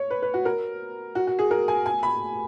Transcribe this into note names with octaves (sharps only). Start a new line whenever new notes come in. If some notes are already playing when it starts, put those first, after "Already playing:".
Already playing: C#5
B4
B4
F#4
A#4
F#4
F#4
G#4
A#4
G#5
G#5
B5